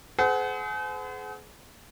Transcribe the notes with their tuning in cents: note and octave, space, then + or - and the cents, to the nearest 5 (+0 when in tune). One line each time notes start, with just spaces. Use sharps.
G#4 +35 C5 -45 F#5 +10